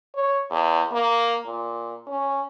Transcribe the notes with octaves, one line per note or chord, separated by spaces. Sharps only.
C#5
E2
A#3
A#2
C#4